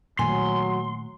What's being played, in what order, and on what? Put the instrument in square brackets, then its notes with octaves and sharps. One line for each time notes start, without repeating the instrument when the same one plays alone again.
[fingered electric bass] A#2 D#3 A3 [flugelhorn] F#3 [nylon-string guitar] G#5 [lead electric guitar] C6